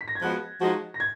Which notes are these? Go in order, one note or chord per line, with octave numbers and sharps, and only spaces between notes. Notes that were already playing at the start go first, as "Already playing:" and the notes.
B6
A#6
G#6
F3 G#3 B3 F#4 F#6
F3 G#3 D#4 F#4
A#6
G#6